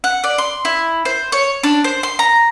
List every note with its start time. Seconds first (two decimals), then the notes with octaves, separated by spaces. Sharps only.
0.04 F#5
0.24 D5
0.38 C6
0.65 E4
1.05 C5
1.32 C#5
1.63 D4
1.84 C5
2.03 C6
2.19 A#5